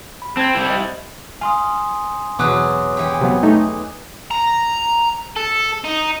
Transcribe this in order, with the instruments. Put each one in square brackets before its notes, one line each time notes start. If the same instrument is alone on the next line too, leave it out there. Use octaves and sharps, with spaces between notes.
[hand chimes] B5
[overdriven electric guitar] C4 [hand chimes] A5 G#6
[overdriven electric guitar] G3 E4
[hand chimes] C5 D#5 E5
[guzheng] F5 [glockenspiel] G#5 C6 D#6
[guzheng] E2 F#3 [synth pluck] B2 [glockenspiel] D6 D#6 F#6
[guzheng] E3 G4
[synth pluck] C3 F#3 B3
A3 D#4
[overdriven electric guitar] A#5
A4
D#4